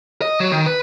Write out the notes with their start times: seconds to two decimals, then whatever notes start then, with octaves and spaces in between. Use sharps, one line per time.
0.22 D#5
0.40 F#3
0.52 D#3
0.66 B4